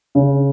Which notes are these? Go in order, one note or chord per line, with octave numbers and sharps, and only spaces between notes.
C#3